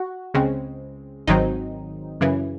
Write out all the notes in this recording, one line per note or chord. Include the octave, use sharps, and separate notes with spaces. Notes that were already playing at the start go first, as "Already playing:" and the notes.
Already playing: F#4
C#2 C#3 G#3 C4
G#1 G#2 D#3 F#3 C4 D#4
F#2 C#3 E3